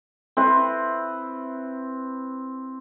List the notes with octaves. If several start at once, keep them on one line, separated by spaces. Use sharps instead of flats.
C4 E4 B4